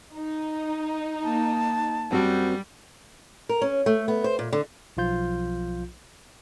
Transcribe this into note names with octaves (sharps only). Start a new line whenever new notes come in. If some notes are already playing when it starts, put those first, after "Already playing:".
D#4
A#3 A5
F#2 G3 C4 F#4
A#4
C#4
A3
B3
C5
A#2
D3
B1 F3 F4 G6